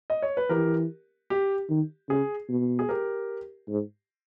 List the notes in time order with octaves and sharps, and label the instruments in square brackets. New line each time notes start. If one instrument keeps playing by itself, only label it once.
[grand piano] D#5
C#5
B4
[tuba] E3 [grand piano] G4 A#4
[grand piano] G4
[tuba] D#3
[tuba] C#3 [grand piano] G#4
[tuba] B2
[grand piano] G#4
G4 A#4
[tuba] G#2